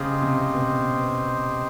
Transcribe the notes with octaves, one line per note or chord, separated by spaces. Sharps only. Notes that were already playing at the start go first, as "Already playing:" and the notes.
Already playing: C#3 G4 C5 D#5
C3
B2